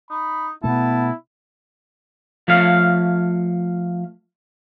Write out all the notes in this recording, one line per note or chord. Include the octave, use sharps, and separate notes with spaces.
D#4 B5
B2 A3 B3 E4 A5
F3 A3 C#5 F5